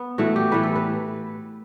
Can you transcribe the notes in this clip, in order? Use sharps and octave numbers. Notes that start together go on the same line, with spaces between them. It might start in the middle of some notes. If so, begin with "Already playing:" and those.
Already playing: B3
A2 E3 A3 F#4
G4
A2 E3 A3 B4
A4
B4